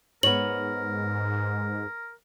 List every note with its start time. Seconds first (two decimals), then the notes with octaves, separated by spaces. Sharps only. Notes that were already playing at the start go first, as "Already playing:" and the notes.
0.23 G#2 B3 A#4 C#5 F#7